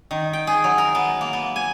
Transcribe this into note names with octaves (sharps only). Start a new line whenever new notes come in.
D#3
G5
G#4
F#3
A#4
B3
A#3
B3
G#5